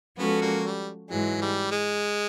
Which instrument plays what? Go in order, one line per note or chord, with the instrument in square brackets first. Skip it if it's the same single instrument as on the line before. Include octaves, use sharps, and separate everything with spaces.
[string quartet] F3 G#3 C#4 F#4 A4 [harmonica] B3
[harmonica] G3 A#3
G3
[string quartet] G#2 E3 G#3 [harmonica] F#3
[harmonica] G3
G#3